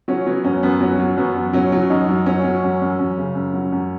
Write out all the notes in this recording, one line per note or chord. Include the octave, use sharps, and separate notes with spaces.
F#3 C#4
F#3 B3
F#2 C#4
F#2 B3
F#3 C#4
F#3
F#2 B3
F#2
F#3 C#4
F#3
F#2 D#4
F#2
F#3 C#4
F#3
F#2
F#2
F#2
C#3
F#2
F#3
F#2